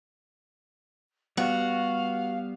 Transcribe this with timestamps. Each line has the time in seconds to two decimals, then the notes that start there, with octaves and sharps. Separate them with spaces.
1.37 G3 B3 F#4 F5